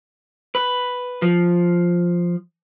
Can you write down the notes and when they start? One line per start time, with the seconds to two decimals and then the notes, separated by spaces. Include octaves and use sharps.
0.55 B4
1.22 F3